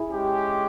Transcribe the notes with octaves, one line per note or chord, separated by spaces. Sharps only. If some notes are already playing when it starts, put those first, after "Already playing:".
Already playing: E4 G#4
G#3 C#4 G4